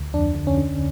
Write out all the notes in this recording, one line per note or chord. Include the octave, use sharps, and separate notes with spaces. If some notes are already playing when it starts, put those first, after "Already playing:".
Already playing: D2
F2 D4
D3
C#4
D3